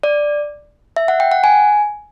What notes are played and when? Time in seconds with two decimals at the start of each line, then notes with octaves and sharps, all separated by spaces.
0.03 D5
0.96 E5
1.08 F#5
1.20 G5
1.32 F#5
1.44 G#5